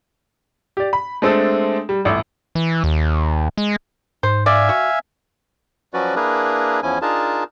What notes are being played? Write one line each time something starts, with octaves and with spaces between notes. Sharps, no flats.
G4 D5
B5
G#3 A3 C4 D4 A4
G3
D#1 A1 E4
E3
D#2
G#3
G#2 C5
D5 E5 F5 G#5
F#4
F3 F#3 C#4 F#4 B4 D5
A#3 D4 E4 G#4 A#4 B4
E2 F3 C#4 E4 G#5
D4 D#4 F4 G#4 A#4 A5